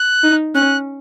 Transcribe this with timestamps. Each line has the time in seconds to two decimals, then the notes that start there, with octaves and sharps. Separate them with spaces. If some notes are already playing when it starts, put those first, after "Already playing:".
Already playing: F#6
0.24 D#4
0.55 C#4 F#6